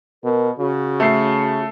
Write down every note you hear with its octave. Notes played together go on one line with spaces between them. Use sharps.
B2 A#4
C#3 F#4
A3 A4 C7